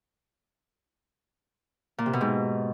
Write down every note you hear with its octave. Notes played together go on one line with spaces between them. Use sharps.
A#2
C3
B2
G#2